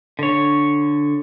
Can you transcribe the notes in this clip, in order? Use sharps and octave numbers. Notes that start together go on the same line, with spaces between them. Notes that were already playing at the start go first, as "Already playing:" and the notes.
D3 C#5